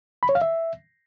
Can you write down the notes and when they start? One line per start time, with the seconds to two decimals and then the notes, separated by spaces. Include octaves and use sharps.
0.23 B5
0.29 C#5
0.35 F5
0.42 E5